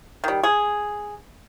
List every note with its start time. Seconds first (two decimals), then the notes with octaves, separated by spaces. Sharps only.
0.24 D#3 G3
0.43 G#4